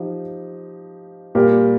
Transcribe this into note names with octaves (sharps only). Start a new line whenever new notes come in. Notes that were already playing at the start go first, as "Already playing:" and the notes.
Already playing: F3 D#4 G4
A#2 G3 A#3 G4 A#4